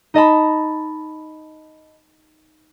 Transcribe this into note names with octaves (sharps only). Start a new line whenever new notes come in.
D#4 D#5 A5 B5